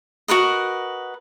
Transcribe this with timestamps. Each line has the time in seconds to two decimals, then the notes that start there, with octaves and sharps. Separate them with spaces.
0.28 F#4 A#4 B4 D#5